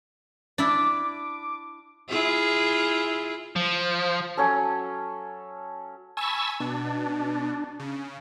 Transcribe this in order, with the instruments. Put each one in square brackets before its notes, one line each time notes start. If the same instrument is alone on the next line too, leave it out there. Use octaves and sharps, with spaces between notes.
[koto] D4 E4 [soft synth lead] D6
[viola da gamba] E4 F4 G#4
[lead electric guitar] F3
[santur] F#3 C#4 A4
[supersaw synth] G#5 B5 [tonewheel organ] A5 C#6 E6
[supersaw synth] B2 [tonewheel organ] D4
[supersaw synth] C#3